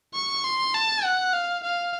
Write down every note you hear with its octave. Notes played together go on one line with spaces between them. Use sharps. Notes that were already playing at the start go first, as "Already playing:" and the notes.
C#6
C6
A5
F#5
F5
F5